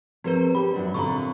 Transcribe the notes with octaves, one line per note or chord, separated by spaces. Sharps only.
F3 C4 G#4 A#4 B4
G4 B5
F#2 F#3 D4
A#2 D3 C4 A#5 B5 C#6